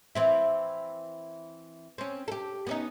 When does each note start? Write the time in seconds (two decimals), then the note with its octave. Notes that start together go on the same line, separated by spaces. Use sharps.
0.15 E3 C4 E4
1.98 C4 C#4
2.28 G4 A4
2.67 B3 C#4 D#4